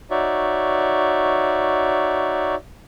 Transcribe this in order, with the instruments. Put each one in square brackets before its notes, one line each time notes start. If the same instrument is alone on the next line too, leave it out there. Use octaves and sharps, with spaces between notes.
[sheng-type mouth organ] D#4 F#4 C#5 D5 E5